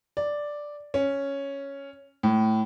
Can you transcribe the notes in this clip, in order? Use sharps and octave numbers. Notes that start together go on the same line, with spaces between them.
D5
C#4
A2